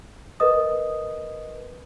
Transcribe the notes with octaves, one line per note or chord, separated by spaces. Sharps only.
A#4 B4 D#5 D#6